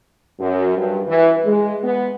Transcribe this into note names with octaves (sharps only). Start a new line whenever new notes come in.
F#2
G2
E3
G#3
B3